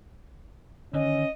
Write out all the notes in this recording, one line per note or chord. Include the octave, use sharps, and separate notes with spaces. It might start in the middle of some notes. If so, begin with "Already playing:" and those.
D3 D#3 C#4 D#5